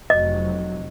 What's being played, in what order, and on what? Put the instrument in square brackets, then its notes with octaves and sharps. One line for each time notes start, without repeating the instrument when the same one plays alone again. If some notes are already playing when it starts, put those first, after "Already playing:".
[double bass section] F1 C3 F#3 [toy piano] D#5